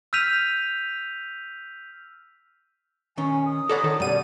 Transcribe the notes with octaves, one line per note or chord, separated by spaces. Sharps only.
E6 F6 G6 B6 D#7 F7
D#3 C#4 G#5
D#6
A4 A#4 C#5 D5 F#5 B5
D#3 A4
F#2 B2 G3 D5 D#7